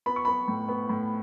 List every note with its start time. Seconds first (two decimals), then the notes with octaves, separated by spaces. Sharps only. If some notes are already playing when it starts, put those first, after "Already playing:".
0.06 B3 B5
0.16 C#6
0.25 B3 B5
0.48 A2
0.68 B3
0.89 A2